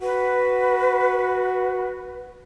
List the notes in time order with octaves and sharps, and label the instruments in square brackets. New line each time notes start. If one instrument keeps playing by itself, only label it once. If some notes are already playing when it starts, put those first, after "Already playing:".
[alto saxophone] F#4 [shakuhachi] B4